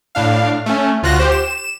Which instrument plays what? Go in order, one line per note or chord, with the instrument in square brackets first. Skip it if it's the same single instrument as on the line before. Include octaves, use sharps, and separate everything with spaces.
[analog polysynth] A2 D4 F5
A3 C#4
D2 F4 F#4 F#6 A#6
G4 C5
E7